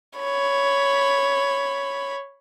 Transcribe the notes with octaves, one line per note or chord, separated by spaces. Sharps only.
C#5 B5